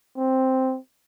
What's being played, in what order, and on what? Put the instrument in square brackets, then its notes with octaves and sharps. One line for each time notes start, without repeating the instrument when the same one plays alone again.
[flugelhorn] C4